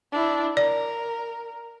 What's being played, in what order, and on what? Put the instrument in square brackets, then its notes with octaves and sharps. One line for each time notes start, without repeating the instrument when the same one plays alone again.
[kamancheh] D4 E4
[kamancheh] A#4 [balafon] D5